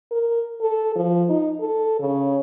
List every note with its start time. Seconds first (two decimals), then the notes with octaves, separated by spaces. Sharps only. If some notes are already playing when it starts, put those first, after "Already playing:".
0.11 A#4
0.61 A4
0.96 F3
1.29 D#4
1.60 A4
2.00 C#3